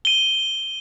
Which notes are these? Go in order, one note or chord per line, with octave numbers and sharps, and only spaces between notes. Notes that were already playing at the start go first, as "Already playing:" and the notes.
D#7 G7